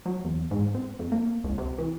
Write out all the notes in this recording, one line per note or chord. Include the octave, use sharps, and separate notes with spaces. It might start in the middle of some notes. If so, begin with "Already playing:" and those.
F#3
E2
G#2
C4
F2
A#3
C#2
C3
E3